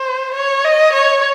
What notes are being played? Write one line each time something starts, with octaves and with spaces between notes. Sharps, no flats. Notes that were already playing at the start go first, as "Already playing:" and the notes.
Already playing: C5
C#5
D#5
C#5